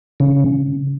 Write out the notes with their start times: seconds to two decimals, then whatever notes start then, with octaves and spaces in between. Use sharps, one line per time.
0.20 C#3